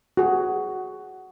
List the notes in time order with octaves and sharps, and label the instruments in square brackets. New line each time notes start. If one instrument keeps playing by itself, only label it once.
[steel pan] F#4 G#4